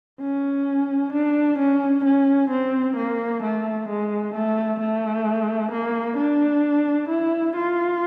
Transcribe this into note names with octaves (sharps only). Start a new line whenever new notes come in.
C#4
D4
C#4
C#4
C4
A#3
A3
G#3
A3
A3
A#3
D4
E4
F4